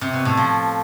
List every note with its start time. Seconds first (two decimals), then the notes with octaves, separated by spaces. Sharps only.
0.01 C3
0.13 B2
0.25 A2
0.37 F3